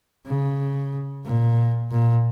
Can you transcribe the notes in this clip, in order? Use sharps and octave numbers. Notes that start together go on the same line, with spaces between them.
C#3
A#2
A#2